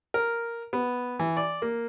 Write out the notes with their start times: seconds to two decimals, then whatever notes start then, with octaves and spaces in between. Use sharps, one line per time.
0.14 A#4
0.73 B3
1.19 E3
1.37 D5
1.62 A#3